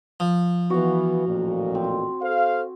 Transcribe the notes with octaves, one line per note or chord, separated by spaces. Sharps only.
F3
E3 B3 F#4 F5
A1 F2 A#2
C4
A4 C5 F5